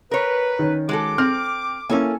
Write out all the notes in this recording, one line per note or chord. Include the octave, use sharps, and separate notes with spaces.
A#4 B4 C#5
D#3 C#4
G#3 F#4 A4 D6
C4 F6
A#3 C#4 E4 A4 C#5 G#5